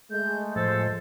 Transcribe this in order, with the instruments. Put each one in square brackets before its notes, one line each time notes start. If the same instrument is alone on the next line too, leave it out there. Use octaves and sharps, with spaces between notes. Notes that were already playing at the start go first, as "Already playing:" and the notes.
[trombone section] G#3 A3 [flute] G6
[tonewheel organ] A2 F3 [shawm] A4 [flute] C5